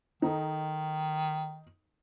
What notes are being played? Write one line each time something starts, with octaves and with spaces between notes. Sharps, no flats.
D#3 D#4 A4